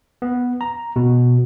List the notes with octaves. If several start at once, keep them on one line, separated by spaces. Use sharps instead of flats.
B3
A#5
B2